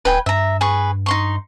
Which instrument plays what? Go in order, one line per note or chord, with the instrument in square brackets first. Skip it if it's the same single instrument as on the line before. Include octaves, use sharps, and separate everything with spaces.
[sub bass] D1 [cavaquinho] B4 G5 G#5
[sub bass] G2 [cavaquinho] E5 A#5
[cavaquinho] G#4 B4 C#6
D#4 C6 C#6